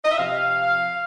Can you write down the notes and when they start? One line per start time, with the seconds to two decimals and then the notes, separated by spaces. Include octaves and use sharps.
0.05 D#5
0.11 E5
0.18 C3 F3 F5